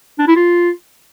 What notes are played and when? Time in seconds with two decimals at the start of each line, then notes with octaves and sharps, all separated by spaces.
0.19 D4
0.27 E4
0.36 F4